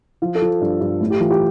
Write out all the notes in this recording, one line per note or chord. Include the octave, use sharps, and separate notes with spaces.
F3 F4
A4
F3
G2
G2
A2
G4
E3 F4
G4